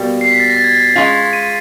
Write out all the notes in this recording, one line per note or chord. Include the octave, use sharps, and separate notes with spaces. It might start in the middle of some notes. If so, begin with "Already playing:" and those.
Already playing: B2 G3 A#3
C7
B6
A6
A#6
A6
G#6
A6
G#3 C#4 F4
D#7